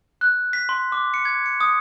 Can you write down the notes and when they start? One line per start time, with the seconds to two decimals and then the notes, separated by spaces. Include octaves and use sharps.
0.21 F#6
0.53 B6
0.69 C6
0.92 D6
1.14 C#7
1.25 G#6
1.46 C#7
1.61 D#6